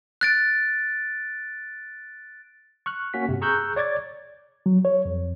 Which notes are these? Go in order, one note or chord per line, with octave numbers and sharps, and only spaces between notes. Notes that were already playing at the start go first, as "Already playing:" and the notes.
F#6 A6 D7
C#6 F6 F#6
A#3 C#4 F#4 B6
G2 C3
G#4 A#5 C#6 E6 F#6 G6
C#5 D5 D6 G#6 A6
F#3
C#5
F2